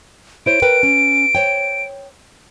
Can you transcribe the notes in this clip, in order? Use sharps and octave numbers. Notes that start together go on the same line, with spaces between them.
E4 C5 C#5 D7
A#4 B4 G5
C#4
C5 C#5 G5